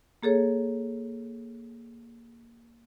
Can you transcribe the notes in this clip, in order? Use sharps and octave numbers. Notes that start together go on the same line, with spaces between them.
A#3 G#4 A4 C#5